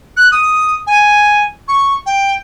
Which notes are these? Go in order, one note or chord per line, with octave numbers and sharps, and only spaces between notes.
F#6
D#6
G#5
C#6
G5